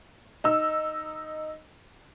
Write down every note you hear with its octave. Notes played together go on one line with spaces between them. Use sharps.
D#4 E6